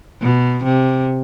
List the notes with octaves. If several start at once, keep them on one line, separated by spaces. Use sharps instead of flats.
B2
C3